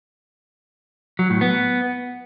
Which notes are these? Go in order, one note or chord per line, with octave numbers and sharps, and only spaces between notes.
F#3
A2
B3